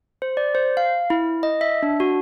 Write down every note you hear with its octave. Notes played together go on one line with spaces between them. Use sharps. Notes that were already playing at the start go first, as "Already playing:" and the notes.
C5
D5
C5
F5
E4
D#5
E5
D4
F#4